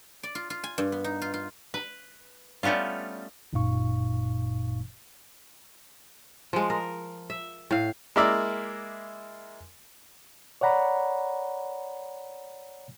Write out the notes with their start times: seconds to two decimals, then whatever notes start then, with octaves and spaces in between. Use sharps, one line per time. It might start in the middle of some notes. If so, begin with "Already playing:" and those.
0.23 D5
0.35 F4
0.50 F4
0.64 G#5
0.78 G2
0.92 B3
1.04 D#4
1.22 F4
1.34 F4
1.74 B4
2.63 G3 A3 B3 C#4 F4
3.53 G1 F#2 A#2 D#4 F5 C#6
6.53 F3 G#3
6.70 A#4
7.30 E5
7.71 A2 F5
8.16 G#3 A#3 E4 A#4 D5 E5
10.61 C#5 D5 F#5 A#5 B5